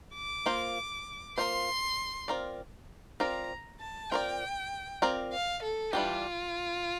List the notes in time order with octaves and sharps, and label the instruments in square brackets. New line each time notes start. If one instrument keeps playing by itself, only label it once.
[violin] D6
[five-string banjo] A#3 F4 C5
[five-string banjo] A#3 F4 C5 [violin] C6
[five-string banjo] C4 F4 A#4 D5
[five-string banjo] C4 F4 A#4 D5 [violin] A#5
[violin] A5
[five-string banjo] C4 F4 A#4 D5 [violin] G5
[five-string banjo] C4 F4 A#4 D5
[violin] F5
A4
[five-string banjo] E3 G3 D4 G4 [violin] F4